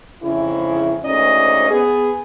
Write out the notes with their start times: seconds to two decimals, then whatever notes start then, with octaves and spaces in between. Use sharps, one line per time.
0.22 F2 G#2 C#3 E3 E4
1.04 D2 G#2 C#4 D#4 D5 D#5
1.71 B3 G#4